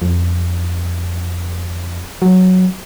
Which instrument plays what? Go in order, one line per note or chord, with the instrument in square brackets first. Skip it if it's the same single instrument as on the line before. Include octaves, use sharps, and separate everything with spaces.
[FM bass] F2
F#3